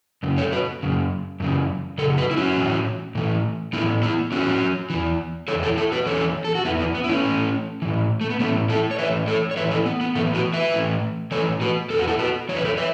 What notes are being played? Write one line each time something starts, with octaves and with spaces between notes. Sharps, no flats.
F#2 C#3
A4 C#5
F#4 B4
F#2 C#3
F#2 C#3 E3
F#2 C#3 A4
F#4 B4
E4
C#4 F#4
A2 E3
A2 E3
A2 E3 B3 E4
B3 E4
A2 E3 C#4 F#4
E2 E3
E3 A4 C#5
E2
E4 A4
E4 A4
F#4 B4
E2 E3 A4 C#5
A4
F#4
E2 E3 B3 E4
B3
B3
E4
A3 C#4
A2 E3
A2 E3
A3
B3
A2 E3 A3 C#4
E4 A4
C#5
A2 E3 B4 E5
A4 C#5
C#5
A2 E3 B4 E5
E4 A4
B3
B3
A2 E3 A3
F#4 B4
B4 E5
A2 E3
E3 A4 C#5
A2
F#4 B4
E2 E3 A4
F#4
E4 A4
F#4 B4
E2 E3 C#5
B4
A4 C#5
B4 E5